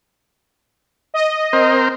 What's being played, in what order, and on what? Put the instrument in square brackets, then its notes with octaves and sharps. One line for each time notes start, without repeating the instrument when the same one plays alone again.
[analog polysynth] D#5
[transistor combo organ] C4 A#4 C5